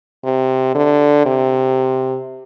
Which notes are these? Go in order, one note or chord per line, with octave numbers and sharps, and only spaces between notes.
C3
D3
C3